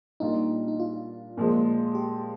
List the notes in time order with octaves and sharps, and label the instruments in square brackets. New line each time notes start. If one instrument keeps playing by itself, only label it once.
[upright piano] A#2 G3 D4 F4 [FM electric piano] D#4
[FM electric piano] D#4
F4
[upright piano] A#2 F3 G#3
[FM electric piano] G4